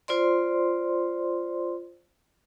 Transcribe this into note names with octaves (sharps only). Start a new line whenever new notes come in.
F4 C5 D5 C6